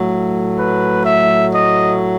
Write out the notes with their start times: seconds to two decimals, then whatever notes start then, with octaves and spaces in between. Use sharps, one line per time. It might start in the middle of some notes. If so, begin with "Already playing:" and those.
Already playing: A2 F#3 A3
0.58 B4
1.05 E5
1.52 D#5